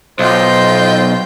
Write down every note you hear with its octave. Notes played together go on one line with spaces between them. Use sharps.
B1 F4 C5 D#5 G5